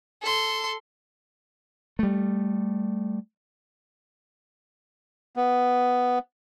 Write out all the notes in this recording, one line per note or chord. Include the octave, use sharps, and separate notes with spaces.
A4 C6
G3 A3
B3